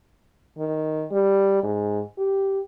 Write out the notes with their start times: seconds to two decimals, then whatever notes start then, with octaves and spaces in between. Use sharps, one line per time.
0.58 D#3
1.12 G3
1.63 G#2
2.18 G4